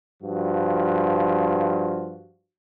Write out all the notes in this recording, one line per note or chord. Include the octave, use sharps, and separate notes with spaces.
G2 F3 F#4